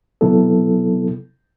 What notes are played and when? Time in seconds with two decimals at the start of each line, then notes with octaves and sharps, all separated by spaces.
0.21 C3 F#3 B3 E4 A4